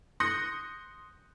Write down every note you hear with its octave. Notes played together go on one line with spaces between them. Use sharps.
C6 D#6 F#6 G6 A#6 C#7